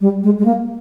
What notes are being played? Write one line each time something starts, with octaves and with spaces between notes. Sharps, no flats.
G3
G#3
G#3
A#3